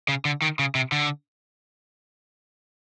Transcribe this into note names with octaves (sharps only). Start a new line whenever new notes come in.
C#3
D3
D#3
C#3
C3
D3